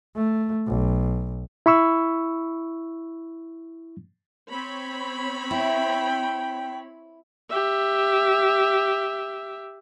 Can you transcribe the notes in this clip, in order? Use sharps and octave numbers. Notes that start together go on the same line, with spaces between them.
A3
B1
E4 B5 C#6 E6
C4 C#5 B5
E4 G5
G4 E5